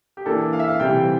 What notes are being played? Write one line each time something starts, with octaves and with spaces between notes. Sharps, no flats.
G4
E3 A#3 D4 A4
F5
E5
F5
C3 E3 G3 C4 G5